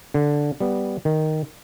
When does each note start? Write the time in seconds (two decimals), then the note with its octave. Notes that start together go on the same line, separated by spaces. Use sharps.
0.14 D3
0.60 G3 B3
1.05 D#3